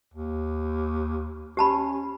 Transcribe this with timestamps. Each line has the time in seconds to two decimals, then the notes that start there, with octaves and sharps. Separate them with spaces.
0.14 D#2
1.57 C#4 G4 A5 B5